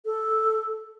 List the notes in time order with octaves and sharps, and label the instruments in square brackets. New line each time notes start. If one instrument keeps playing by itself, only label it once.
[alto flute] A4